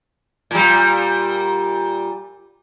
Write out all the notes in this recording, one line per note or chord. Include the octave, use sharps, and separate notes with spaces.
A#2 G3